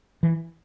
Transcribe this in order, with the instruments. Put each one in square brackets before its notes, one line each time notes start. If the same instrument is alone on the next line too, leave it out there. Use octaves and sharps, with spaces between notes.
[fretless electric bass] E3